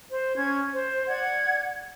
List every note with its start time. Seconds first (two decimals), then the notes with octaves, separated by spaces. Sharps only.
0.10 C5
0.36 C#4 G#6
0.72 C5
1.08 D5 F#5 G#6